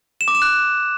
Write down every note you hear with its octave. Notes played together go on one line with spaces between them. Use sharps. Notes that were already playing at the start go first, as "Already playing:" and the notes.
E7
D6
E7
F#6